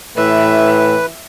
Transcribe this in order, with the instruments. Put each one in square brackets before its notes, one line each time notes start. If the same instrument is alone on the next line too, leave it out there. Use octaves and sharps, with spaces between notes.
[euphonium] A2 [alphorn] E3 [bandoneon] B4 [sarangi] E5